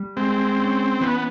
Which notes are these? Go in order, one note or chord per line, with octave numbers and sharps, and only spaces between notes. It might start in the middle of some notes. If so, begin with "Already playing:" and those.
Already playing: G3
G#3 C4
C#4
E3 B3